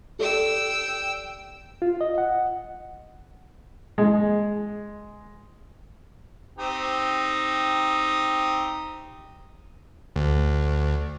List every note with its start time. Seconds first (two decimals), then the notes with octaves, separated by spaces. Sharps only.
0.19 G4 A4 D5 G5 E6
1.82 F4
2.01 D#5
2.18 F#5
3.98 G#3
6.59 C4 D#4 G4
10.16 D2